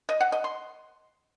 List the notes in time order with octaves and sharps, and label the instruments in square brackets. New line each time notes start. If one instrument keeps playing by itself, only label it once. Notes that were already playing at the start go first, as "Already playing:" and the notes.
[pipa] D#5
F#5
D#5
C6